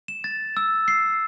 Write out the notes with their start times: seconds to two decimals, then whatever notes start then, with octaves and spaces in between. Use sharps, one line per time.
0.08 E7
0.24 A6
0.57 E6
0.88 C7